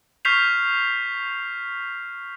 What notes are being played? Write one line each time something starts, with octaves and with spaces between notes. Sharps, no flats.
C#6 F6 G6 B6 C7 F7